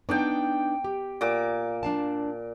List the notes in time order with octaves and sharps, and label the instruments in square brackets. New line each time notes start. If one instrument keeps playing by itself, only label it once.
[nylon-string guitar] B3 D4 D#4 [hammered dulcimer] G5 D6
[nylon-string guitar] G4
[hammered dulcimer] A#2 D6
[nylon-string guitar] D4 F5 A5